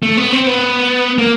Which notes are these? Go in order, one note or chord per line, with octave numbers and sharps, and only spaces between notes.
A3
B3
C4
B3
A#3